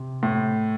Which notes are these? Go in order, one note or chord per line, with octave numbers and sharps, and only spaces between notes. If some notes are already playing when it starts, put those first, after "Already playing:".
Already playing: C3
A2